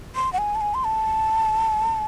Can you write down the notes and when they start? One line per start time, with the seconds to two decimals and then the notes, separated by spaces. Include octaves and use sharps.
0.16 C6
0.33 F#5
0.38 G#5
0.55 A5
0.61 G#5
0.74 C6
0.84 A5